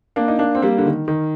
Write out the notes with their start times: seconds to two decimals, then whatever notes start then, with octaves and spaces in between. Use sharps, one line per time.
0.16 A#3 D4
0.28 D#4
0.39 A#3 D4
0.55 C4
0.62 G3 A#3
0.78 D3
0.86 D#3
1.08 D#3